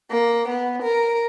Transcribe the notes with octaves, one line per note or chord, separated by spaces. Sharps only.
A#3
B3
A#4